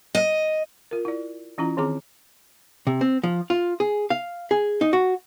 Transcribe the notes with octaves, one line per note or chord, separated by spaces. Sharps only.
D#5
F4 A#4
E4 D5
E3 C#4 E4 F4 A#5
D#3 C4 G#4 A#5 D6
C3
C4
F3
F4
G#4
F5
G#4
D#4
F#4